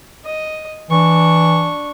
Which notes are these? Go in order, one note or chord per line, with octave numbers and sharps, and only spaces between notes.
D#5
E3 D4 C#6